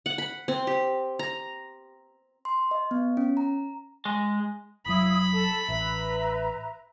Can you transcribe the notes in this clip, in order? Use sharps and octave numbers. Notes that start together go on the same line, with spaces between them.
F#5
B5
C4
G4
A#5
C6
D#5
B3
C#4
A#5
G#3
F1 F#3 E4 F5 B5 D#6
A4 A5
A1 B4 E5 A#5